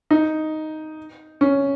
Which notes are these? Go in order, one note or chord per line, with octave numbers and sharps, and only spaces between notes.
D#4
C#4